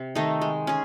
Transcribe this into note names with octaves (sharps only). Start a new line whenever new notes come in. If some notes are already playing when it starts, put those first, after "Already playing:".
Already playing: C3
D#3 A3 D#4
G#3
C#4 G#4